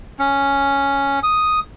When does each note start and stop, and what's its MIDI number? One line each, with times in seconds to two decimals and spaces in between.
0.19 1.19 61
1.23 1.60 87